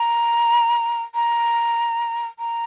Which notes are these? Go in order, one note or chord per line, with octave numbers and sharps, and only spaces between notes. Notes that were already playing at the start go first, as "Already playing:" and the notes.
Already playing: A#5
A#5
A#5